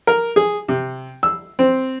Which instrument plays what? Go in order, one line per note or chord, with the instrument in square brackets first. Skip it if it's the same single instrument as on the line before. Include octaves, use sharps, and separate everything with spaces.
[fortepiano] A#4
G#4
C3
E6
C4